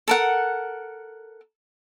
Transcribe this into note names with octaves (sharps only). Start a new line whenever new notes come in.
A4 A#4 F#5